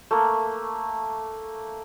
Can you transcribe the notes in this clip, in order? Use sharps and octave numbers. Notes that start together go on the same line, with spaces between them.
A3 A#3